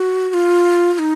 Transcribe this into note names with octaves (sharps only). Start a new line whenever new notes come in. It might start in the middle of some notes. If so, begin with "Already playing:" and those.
Already playing: F#4
F#4
F4
F4
D#4